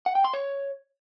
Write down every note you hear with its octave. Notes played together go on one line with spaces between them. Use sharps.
F#5
G5
C6
C#5